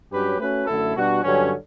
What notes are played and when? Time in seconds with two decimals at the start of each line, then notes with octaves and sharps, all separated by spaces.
0.11 G2 F#3 C#4 G4 B4
0.39 A3 C#4 F#4 B4
0.67 F#2 D3 A3 E4 A4
0.95 B2 G3 D4 F#4
1.23 G2 D3 F#3 C#4